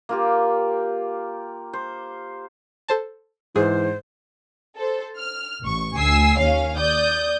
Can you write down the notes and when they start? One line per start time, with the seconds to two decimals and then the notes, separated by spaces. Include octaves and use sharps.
0.09 A#3 F4 G4
1.73 C5
2.88 A4 C5 A5
3.56 G#2 E3 G#4 C5
4.77 A4 C5
5.16 F6
5.61 A1 C#6
5.95 D2 G#5 E6 C7
6.38 D#2 C#4 F5
6.76 D5 D#6 G6